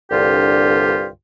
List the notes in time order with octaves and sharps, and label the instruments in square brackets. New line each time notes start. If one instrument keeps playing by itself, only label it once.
[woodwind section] C2 G2 D3 F4 G4